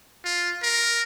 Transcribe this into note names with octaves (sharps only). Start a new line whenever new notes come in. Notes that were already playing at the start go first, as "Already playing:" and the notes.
F4
A#4